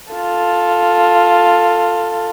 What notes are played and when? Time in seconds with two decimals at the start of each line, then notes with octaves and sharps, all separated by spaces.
0.12 F4 A4